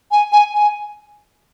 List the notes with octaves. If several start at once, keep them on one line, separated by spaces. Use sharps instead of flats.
G#5
G#5
G#5